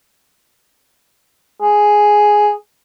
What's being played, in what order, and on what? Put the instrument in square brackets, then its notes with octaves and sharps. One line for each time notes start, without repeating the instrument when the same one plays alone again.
[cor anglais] G#4